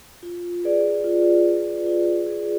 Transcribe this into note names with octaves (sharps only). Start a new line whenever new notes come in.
F4
G#4 B4 D5
F4
G#4 B4 D5
F4
G#4 B4 D5